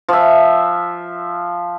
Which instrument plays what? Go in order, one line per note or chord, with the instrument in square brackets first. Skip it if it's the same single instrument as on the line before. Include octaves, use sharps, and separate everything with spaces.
[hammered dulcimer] F3 E5